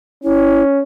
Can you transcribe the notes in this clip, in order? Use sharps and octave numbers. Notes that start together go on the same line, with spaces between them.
C#4 E4